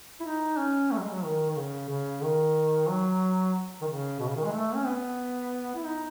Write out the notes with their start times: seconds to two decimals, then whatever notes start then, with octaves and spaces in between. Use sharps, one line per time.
0.20 E4
0.25 D#4
0.58 C#4
0.92 A3
0.98 F#3
1.02 G#3
1.13 F#3
1.24 D#3
1.50 D#3
1.56 C#3
1.89 C#3
2.23 D#3
2.88 F#3
3.81 D#3
3.88 C#3
4.20 B2
4.29 C#3
4.37 D#3
4.44 G#3
4.53 A3
4.75 C#4
4.86 B3
5.75 E4
5.85 D#4